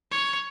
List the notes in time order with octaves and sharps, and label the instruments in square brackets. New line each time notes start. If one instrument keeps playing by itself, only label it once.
[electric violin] C#5